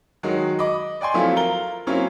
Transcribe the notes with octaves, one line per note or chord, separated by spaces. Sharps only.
D#3 F#3 G#3 F#4
D#5 B5 D6
D5 G5 G#5 C6
F3 F#3 A3 C4 E4 F4
F4 A#4 G7
F#3 A#3 C4 C#4 E4 F4